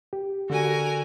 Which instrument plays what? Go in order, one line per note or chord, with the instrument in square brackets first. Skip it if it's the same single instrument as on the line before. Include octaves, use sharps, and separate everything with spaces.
[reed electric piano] G4
[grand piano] D3 [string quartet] F#4 A#4 G#5